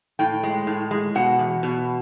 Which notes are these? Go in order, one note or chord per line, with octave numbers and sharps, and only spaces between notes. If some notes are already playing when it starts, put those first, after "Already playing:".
A2 G5
G#3
A2
G#3
B2 F#5
E2
B2